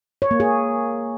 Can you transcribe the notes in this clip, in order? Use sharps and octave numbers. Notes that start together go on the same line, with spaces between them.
C#5
A#3
G#4